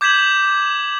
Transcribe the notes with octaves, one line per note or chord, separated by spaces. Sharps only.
D6 G6 G#6 B6 E7 F#7